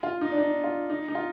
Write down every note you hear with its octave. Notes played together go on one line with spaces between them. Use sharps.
F4
D#4
D4
D#4
F4
D#4
D#4
F4